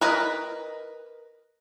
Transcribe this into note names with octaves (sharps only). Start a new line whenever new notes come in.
A#4 B4 D#5